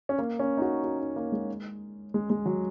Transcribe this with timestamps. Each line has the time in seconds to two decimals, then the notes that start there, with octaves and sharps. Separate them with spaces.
0.09 C#4
0.19 A#3
0.40 C#4
0.57 D#4
0.61 F#4
0.84 F#4
0.99 D#4
1.16 A#3
1.32 G#3
2.14 G#3
2.30 G#3
2.46 F#3